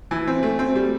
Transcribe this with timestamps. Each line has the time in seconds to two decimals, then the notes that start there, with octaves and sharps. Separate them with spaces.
0.11 E3
0.27 C4
0.43 A3
0.59 C4
0.75 G3